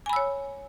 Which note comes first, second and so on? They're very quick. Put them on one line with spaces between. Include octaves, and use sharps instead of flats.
G#5 B5 E6 C#5